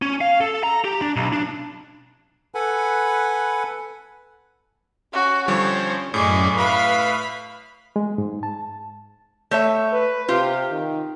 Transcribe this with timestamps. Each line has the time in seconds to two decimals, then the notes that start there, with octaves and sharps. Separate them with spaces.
0.02 C#4
0.21 F5
0.41 A4
0.63 A#5
0.84 G4
1.01 D4
1.16 B1
1.33 D4
2.55 A4 B4 F#5 G#5 B5
5.13 C#4 F#4
5.48 D3 F3 G3 C5 C#5
6.14 F#2 A2 G#4 D5 D#5
6.56 B4 E5 F5 B5
7.96 G#3
8.18 G#2
8.43 A5
9.51 A3 C#5 E5
9.92 B4
10.28 C3 F4 G4
10.71 D#3